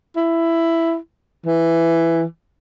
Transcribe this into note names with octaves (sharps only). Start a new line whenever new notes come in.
E4
E3